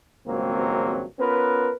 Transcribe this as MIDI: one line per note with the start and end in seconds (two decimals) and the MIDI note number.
0.27 1.04 32
0.27 1.04 37
0.27 1.04 43
0.27 1.04 54
0.27 1.04 58
0.27 1.04 60
1.19 1.70 59
1.19 1.70 61
1.19 1.70 65
1.19 1.70 70
1.19 1.70 71